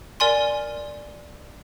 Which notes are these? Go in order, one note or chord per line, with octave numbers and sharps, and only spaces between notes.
A#4 D5 G#5 C6